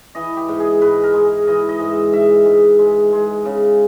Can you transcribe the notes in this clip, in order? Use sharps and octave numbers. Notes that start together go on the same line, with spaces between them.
E3 D#5
G4
G#2
G#4
G#2 B4
A#4
G#3
E3 D#5
D#5
G#2
E5
G#2 E5
G#2
G#3
G#3
C#3